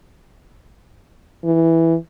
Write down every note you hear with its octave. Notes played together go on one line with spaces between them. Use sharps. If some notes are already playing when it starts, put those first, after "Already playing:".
E3